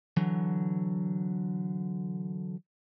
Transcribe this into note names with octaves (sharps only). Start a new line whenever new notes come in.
D3 E3 F#3